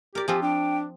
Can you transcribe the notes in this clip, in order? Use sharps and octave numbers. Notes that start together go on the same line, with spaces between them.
G4 A#4 D5
F3 C4 F4 G4 G#5
D4 G5